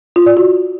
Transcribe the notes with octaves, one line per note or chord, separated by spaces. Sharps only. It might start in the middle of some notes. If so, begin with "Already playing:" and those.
F4
D5
F#4